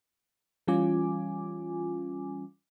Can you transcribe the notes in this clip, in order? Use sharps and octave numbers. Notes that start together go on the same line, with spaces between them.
E3 G3 C#4 F4 G#5 D6